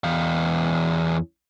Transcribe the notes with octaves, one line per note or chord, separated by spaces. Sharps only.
E2 F5